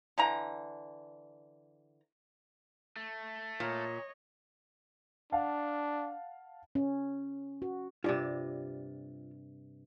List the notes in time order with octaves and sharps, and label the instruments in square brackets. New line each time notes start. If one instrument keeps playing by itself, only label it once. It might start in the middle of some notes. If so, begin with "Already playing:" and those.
[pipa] D3 E3 A#5
[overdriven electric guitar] A3
[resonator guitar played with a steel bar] A#2 [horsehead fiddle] C#5 D#5
[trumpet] D4 [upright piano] F5 F#5 A5
[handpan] C#4
F#4
[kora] G2 C3 [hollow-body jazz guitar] F4 D5